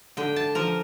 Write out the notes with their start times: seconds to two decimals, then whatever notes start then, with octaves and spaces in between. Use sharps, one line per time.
0.17 D3 G5
0.36 A5
0.55 F3 A#4